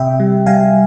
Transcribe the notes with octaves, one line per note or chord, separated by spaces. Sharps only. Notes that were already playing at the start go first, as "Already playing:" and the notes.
Already playing: C3 E5 G5
G3
G3 F5 G#5